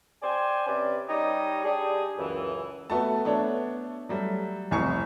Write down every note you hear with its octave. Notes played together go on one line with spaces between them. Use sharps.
C5 D5 G5 G#5
C3 C#4 B4 D5
G3 D#4 G4 C#5 D#5
G3 D4 G4 G#4
C#2 F#2 E3
A3 B3 F#4 A4 B4 A5
A3 B3 D4 C#5
F#3 G3 A3
F1 C2 E4 G#5 C#6 C#7